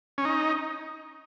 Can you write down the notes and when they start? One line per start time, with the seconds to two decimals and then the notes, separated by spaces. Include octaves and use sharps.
0.18 C#4
0.25 D#4